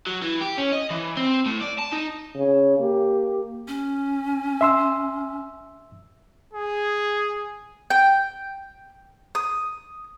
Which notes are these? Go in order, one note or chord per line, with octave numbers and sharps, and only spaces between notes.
F#3
E3
G4
C#4
D#5
E3
C4
A2
D5
A5
D#4
C#3 C#5
A#3 G4
C#4
E5 C6 E6
G#4
G5
D#6